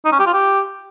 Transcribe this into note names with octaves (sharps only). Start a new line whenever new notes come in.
D#4
C#4
G4
F4
G4